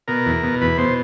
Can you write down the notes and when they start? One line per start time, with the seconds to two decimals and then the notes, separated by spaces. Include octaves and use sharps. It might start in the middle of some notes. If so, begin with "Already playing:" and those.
0.08 B2 A#4
0.26 E2
0.43 B2
0.61 E2 B4
0.78 B2 C5